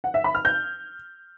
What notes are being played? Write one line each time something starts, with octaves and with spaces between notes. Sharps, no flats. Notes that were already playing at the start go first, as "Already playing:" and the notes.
F#5
E5
B5
F6
G6